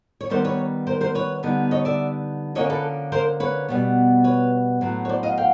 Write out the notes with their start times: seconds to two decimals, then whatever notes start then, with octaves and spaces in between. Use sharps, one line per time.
0.21 C#5
0.30 D#3 G3 B3 D#4 A#4 C5
0.45 B4 C#5
0.87 A#4 C5
1.01 A#4 C5
1.15 B4 C#5
1.43 D3 G3 B3 D#4
1.71 C#5 D#5
1.85 D5 E5
2.55 D3 F3 A#3 C#4 C#5 D#5
2.70 A4 B4
3.12 A#4 C5
3.40 B4 C#5
3.68 B2 G3 B3
4.24 B4 C#5
4.81 A2 F#3 B3
5.05 C#5
5.09 C5 D5
5.23 D#5 F5
5.38 F5 G5